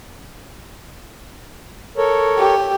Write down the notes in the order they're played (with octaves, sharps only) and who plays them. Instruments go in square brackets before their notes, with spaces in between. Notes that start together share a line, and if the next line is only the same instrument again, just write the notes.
[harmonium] A4 A#4 C#5
[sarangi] G4